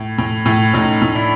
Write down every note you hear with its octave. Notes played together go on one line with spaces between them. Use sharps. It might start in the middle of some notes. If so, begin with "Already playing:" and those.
Already playing: A2
A2
A2
A2 C#4 D#4
A2
D4 E4